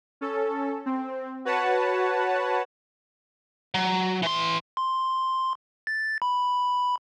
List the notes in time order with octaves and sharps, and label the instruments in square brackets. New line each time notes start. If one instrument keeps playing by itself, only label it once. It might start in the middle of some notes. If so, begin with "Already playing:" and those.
[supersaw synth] C#4 A4
C4
F#4 B4 C#5 F#5 A5
[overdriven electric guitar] F#3
E3 C6
[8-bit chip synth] C6
A6
B5